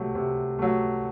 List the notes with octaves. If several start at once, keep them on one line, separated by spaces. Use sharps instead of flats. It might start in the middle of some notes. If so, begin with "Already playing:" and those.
Already playing: C3 F#3 A3
C3
F#3 A3